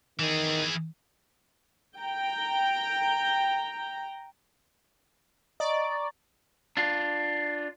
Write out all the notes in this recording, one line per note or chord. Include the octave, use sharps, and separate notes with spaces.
D#3 E3 G#4
G5 A#5
D5 D#5 A#5 C#6
D4 F4